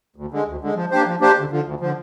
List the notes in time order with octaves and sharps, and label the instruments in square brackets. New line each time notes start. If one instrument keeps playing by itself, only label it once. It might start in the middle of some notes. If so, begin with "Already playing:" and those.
[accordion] D2
D3 G#3
D2
D3 G#3
F3
A#3 D4 G4 C5
F3
A#3 D4 G4 C5
D2
D3 F3
D2
D3 F3